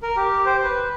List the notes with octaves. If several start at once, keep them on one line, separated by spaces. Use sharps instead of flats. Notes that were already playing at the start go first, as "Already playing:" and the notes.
A#4
G4
C5
B4